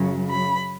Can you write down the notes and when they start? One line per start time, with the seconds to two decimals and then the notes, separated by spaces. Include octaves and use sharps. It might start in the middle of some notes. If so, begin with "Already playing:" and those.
Already playing: F#2 C#3 F#3
0.29 B5